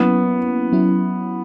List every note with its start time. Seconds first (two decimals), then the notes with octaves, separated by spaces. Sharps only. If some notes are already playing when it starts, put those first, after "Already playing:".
Already playing: F#3 A#3 B3 C#4 E4
0.72 F#3 C#4 E4